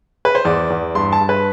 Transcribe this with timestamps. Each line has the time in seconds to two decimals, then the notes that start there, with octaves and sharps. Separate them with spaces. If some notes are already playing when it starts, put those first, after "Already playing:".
0.25 B4
0.35 C5
0.45 E2 D5
0.70 E2
0.95 G2 C6
1.12 A5
1.21 G2
1.29 B4